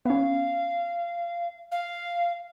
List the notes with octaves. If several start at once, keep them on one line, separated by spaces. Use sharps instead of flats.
B3 C#4 F5
F5